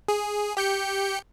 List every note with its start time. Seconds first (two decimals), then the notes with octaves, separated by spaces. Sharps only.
0.08 G#4
0.57 G4 G6 C#7